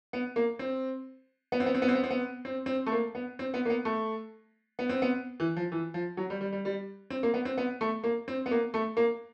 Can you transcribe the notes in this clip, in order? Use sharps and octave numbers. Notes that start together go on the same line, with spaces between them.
B3
A#3
C4
B3
C4
B3
C4
B3
C4
B3
C4
B3
C4
C4
A3
A#3
B3
C4
B3
A#3
B3
A3
B3
C4
B3
E3
F3
E3
F3
F#3
G3
G3
G3
G3
C4
A#3
B3
C4
B3
A3
A#3
C4
B3
A#3
A3
A#3